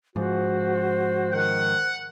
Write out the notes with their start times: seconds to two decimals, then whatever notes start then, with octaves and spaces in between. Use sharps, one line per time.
0.16 G#2 F3 F#4 C5
1.32 D#3 F#5